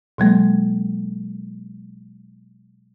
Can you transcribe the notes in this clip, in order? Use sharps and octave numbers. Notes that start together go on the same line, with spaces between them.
B2 F#3 G#3 A#3